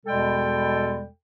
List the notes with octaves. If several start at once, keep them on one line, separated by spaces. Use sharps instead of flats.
E2 B2 G3 G#3 A4 G5